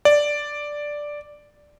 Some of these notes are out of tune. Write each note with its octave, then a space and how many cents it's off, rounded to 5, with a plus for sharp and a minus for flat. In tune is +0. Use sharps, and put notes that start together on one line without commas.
D5 +0